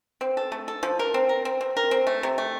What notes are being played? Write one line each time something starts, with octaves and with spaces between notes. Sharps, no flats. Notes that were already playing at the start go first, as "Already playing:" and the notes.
C4
A4
A3
A4
F3
A#4
C4
A#4
C4
C4
A#4
C4
A3
C3
A3